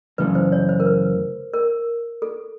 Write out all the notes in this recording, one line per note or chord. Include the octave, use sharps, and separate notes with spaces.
F#2 C#3 E3 A3 B4
C5
C#5
C5
A#4
B4
A#4
A4